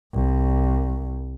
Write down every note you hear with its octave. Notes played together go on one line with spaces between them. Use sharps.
C2